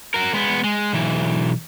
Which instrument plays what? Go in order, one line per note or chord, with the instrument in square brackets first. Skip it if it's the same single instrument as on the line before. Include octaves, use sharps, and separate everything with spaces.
[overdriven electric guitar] F#4 A#4
G#3 B3
G#3
B1 E3